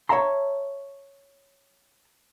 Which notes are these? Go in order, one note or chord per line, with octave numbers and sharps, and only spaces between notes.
C#5 D5 E5 A5 A#5 C6